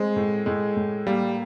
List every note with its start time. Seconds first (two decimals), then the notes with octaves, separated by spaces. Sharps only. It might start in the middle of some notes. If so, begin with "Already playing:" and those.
Already playing: G#3 C4
0.16 A2
0.46 A2 G#3
0.76 A2
1.07 G3 A#3